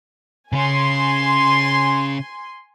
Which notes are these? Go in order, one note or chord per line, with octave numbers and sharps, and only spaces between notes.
C#3 C#4 G#5 C6